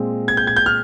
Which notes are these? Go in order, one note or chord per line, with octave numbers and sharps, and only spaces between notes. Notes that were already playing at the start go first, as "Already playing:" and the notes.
Already playing: A#2 G#3 C4
G#6
G6
G#6
G6
F6